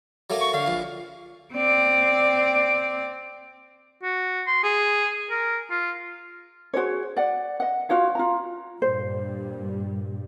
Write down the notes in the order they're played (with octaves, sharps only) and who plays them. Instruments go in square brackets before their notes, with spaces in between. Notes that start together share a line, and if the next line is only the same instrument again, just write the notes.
[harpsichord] F#3 A3 A#3
[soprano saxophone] C#6
[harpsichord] D3 [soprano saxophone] F5
[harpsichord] A#1 A#2
[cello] C4 D5
[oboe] F#4
C6
G#4
A#4
F4
[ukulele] F#4 G#4 C5 C#5
D5 F#5
D#5 F#5
F4 F#4 C#5 F5
F4 A#5
[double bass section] G2 A#2 G3 [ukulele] C5